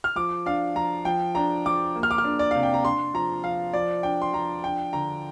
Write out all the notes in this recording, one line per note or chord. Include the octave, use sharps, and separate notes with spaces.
F6
F3 D6
D4 F5
F3 A#5
F3 G5
D4 A#5
F3 D6
A#3
F6
D6
F6
D4
D5
C3 F5
G5
A#5
D4 C6
F3 A#5
F3 F5
F3 D5
D4 G5
C6
F3 A#5
D4 G5
D3 A#5